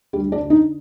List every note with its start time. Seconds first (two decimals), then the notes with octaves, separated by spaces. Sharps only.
0.13 D2 G3
0.32 D4
0.41 D3
0.50 D#4